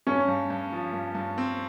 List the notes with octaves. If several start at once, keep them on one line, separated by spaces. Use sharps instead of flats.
G2 C#4
G2
G2
F3
G2
G2
C4